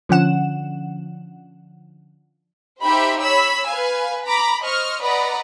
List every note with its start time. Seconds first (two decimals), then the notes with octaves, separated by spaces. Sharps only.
0.09 D3 F3 C#4 F#5 E7
2.81 D#4 G4 C5 E5 B5
3.20 C#5 B5 E6
3.67 B4 F5 G#5
4.25 A#5 B5 D6
4.63 C5 D#5 C#6 F6
5.03 B4 D5 D#5 F#5 A#5 B5